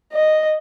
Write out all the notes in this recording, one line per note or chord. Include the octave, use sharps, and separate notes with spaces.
D#5